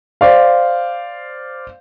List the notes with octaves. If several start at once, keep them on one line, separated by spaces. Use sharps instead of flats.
C5 D5 F5